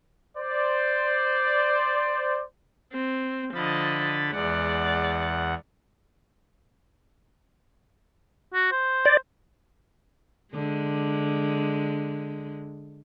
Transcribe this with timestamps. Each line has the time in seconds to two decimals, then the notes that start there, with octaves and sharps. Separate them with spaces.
0.37 C5 D5
2.93 C4
3.54 D3 F3 D#5 B5 A6
4.32 E2 G#3 D5 F#5
8.54 F#4
8.72 C5
9.05 D5
10.54 D3 G#3